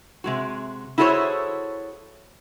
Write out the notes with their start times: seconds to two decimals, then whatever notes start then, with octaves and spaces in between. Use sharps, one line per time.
0.24 C3 G#3 F#4
0.98 E4 F#4 G#4 A4 C5 C#5